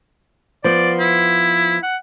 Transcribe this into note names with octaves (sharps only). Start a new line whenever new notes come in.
F3 B3 D5
E4
F#5